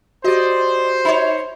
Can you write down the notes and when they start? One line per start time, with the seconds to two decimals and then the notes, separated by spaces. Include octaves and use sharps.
0.24 F#4 G4 C5 D5 D#5
1.05 D#4 C#5